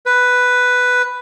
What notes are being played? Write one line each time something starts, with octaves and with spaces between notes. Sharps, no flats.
B4